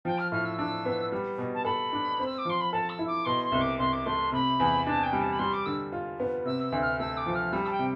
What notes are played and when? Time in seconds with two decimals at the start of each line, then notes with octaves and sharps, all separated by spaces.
0.05 F3 G5
0.19 F6
0.32 A2 F6
0.46 E6
0.58 D4 E6
0.85 B3
1.12 G3
1.38 B2
1.55 A5
1.65 A4 B5
1.93 D4
2.19 C4
2.26 E6
2.38 D6
2.45 F3 C6
2.61 B5
2.73 A4 A5
2.90 E6
2.99 E4
3.07 D6
3.25 B2 C6
3.43 C6
3.52 C2
3.61 D6
3.79 C2 C6
3.93 D6
4.06 A3 C6
4.32 C3 B5
4.60 E2
4.86 D4 A5
5.03 G5
5.13 G3
5.21 A5
5.33 B5
5.39 G3 C6
5.53 D6
5.66 D3 E6
5.92 F4
6.20 B3
6.45 C3 E6
6.64 E6
6.72 D2
6.82 F6
6.99 A3 E6
7.17 D6
7.26 F3
7.35 F6
7.53 G3 E6
7.66 A5
7.71 G5
7.79 C3